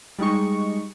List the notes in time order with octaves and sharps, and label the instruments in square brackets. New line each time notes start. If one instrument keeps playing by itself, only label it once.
[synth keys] G3 G#3 D#4 C#6